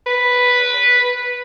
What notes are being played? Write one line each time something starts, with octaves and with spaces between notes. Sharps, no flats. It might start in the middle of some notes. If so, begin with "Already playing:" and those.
B4